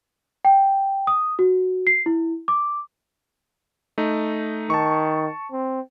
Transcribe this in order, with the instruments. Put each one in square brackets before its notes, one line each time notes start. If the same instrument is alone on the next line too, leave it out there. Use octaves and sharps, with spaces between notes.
[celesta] G5
D#6
F#4
C7
E4
D6
[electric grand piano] A3 D#4
[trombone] D#3 [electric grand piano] A5 C#6
[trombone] C4